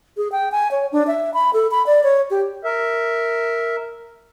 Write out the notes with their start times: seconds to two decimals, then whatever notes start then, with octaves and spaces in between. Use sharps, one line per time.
0.17 G#4
0.32 G5
0.52 G#5
0.71 C#5
0.92 D4
1.07 E5
1.34 B5
1.54 A4
1.71 B5
1.86 D5
2.03 C#5
2.30 G4
2.65 A#4 E5